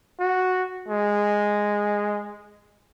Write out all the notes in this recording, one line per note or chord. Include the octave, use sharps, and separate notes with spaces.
F#4
G#3